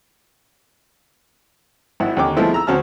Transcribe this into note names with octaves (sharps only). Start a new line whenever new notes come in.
G#1 E4 F#5
D#2 D3 C#4 G5 D6
F3 G#3 A3 B3 C4 E4
A#5 E6
D2 C4 C#4 F#4 A5 F6